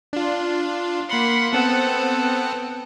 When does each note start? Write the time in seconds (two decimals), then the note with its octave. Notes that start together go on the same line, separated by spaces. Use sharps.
0.13 D4 F4
1.09 A#3 F#5 B5 C6
1.53 B3 C4 A4 F#5